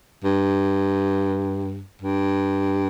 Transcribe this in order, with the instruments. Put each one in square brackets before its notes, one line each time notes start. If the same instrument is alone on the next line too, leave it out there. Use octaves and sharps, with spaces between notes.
[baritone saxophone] G2
G2